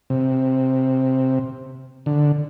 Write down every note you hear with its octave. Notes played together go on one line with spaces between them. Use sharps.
C3
D3